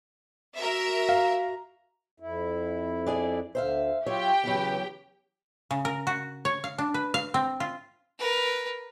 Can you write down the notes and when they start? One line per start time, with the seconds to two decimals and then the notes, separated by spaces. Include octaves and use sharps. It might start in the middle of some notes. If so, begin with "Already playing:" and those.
0.59 F#4 A#4 E5 A#5
1.09 F5
2.20 F2 E4
3.06 D4 G#4 D5
3.55 D2 D3 C5 E5 F5
4.06 F#3 F4 G4 C#5 E5 G5
4.44 E2 C#3 F#3 B4
5.71 C#3
5.85 A#4
6.07 F#4
6.45 C#5
6.64 F5
6.78 D4
6.94 B4
7.14 F5
7.34 C4
7.60 F4
8.19 A#4 B4